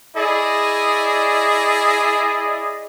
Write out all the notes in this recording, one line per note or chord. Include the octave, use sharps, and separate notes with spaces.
E4 G#4 D5 D#5